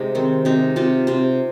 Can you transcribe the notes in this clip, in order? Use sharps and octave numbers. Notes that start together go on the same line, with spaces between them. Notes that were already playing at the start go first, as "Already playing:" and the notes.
Already playing: C3 G#3 D#4
D#3 C4
C3 D#4
C3 F4
C3 C5